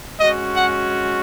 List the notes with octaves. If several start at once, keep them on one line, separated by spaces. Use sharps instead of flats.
G#3 C#4 F#4 D#5
F#5